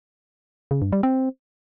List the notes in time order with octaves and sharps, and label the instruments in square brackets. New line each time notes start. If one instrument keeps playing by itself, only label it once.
[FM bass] C#3
G2
G3
C4